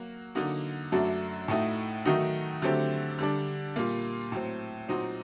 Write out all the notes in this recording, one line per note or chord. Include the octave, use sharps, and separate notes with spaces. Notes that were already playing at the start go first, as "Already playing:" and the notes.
Already playing: F#3 A#3 F#4
D3 F#3 A#3 D#4 F#4
F#2 F#3 A3 D4 F#4
A2 A3 D#4 F#4
D#3 F#3 A3 D#4 F#4
D3 F#3 A3 C4 G4
D3 G3 D4
A#2 G3 A#3
A2 F#3 C4
A#2 F#3 C4 D#4 F#4